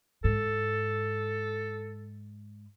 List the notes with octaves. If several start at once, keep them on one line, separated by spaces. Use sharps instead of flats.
G#2 A4